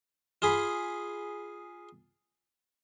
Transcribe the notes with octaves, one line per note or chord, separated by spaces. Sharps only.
F4 G#4 B5